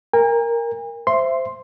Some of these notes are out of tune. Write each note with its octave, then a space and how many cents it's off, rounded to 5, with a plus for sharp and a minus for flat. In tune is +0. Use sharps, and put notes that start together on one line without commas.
A#4 +0 G#5 -45
C5 +0 E5 +20 C6 +0